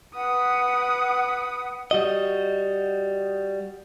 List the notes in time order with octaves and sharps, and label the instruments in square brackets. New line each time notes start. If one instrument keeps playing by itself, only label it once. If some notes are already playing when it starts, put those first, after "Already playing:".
[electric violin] B4 D#6 [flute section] F#5
[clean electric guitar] G3 F#4 D#5